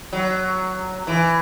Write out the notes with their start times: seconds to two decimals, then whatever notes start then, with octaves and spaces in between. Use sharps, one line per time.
0.13 F#3
1.07 E3